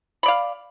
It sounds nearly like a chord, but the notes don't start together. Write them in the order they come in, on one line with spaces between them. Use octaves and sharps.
B5 D5 F5